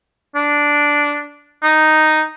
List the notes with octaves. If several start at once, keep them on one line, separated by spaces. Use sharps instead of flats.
D4
D#4